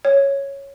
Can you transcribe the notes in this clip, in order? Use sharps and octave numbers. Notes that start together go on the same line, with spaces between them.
C#5